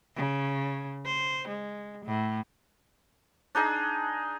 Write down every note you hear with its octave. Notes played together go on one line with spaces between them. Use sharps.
C#3
C5
G#3
A2
D4 D#4 G#4 D#5